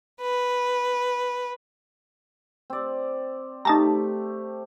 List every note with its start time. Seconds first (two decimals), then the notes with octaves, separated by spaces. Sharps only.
0.21 B4
2.70 C4 D5
3.65 A3 D#4 G4 A5 A#5